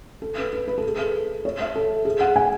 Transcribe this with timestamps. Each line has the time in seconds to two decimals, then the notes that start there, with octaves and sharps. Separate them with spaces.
0.22 A4
0.38 B4
0.53 B4
0.68 B4
0.78 A4
0.87 G#4
0.98 A4
1.45 C#5
1.60 E5
1.75 A4
2.05 G#4
2.21 F#5
2.36 G#5